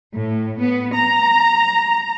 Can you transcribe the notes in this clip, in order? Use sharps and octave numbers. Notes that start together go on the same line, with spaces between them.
A2
B3
A#5